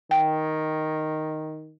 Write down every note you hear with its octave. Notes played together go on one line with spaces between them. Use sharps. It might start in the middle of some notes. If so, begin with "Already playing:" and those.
D#3 G5